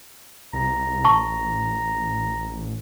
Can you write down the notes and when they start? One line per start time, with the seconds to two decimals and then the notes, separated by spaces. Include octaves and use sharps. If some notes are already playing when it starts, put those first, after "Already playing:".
0.53 C2 A#5
1.04 A1 A5 C#6